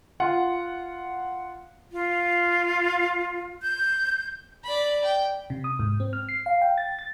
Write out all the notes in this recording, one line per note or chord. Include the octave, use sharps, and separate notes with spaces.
F4 F#5
F4
G6
D5 B5
G5
C3
D#6
G#2
C4
F6
C7
F5
G5
A6
A6